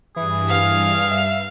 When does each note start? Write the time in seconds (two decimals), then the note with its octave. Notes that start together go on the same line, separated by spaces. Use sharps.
0.16 G2 E3 G#4
0.48 F5 F6
1.11 E5